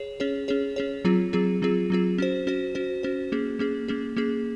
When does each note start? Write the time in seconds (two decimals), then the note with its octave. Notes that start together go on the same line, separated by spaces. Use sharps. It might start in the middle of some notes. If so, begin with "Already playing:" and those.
Already playing: G#4 C#5
0.20 C#4 G#4 C#5
0.48 C#4 G#4 C#5
0.76 C#4 G#4 C#5
1.05 F#3 C4 F4 G#4
1.33 F#3 C4 F4 G#4
1.62 F#3 C4 F4 G#4
1.90 F#3 C4 F4 G#4
2.18 C#4 F#4 C5
2.47 C#4 F#4 C5
2.75 C#4 F#4 C5
3.03 C#4 F#4 C5
3.32 A#3 C#4 G#4
3.59 A#3 C#4 G#4
3.88 A#3 C#4 G#4
4.17 A#3 C#4 G#4